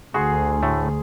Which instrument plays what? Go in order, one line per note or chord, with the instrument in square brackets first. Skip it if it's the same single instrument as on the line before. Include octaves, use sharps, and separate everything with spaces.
[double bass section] D2 [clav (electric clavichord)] F#4 [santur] G#4 C6 C#6
[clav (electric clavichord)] A2 A3